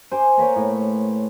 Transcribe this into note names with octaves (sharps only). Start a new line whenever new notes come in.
C5 G#5 D6
A#3 A#4 B4 C#5
A2